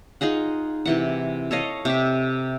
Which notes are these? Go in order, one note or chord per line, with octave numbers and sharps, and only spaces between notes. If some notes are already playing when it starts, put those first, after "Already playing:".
D#4 F4 G#4 F#5
C3 E3 F#5
A4 C#5 D#5 F5
C3 G4 E5